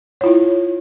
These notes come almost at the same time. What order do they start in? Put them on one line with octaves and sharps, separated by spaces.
C#5 F4 E4